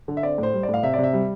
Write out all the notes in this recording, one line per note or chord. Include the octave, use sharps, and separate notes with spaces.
D3
E5
C4 D5
A2 C5
G3
D5
A2
F5
C3 E5
D5
C3 E5
G3